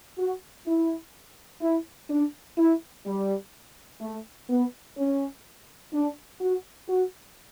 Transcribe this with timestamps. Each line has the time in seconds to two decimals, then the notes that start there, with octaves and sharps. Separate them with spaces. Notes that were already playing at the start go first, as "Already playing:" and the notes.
0.18 F#4
0.66 E4
1.62 E4
2.10 D4
2.58 E4
3.06 G3
4.01 A3
4.49 B3
4.97 C#4
5.93 D4
6.41 F#4
6.89 F#4